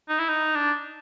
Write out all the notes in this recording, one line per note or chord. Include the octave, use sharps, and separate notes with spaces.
D#4
E4
D#4
D4